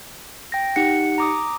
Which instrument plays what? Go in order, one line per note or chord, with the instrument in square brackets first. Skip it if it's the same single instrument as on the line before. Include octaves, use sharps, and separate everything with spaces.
[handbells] G5 A#6
[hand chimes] D#4 G4 C#7 [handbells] F#5
[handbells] A#5 D6 D#6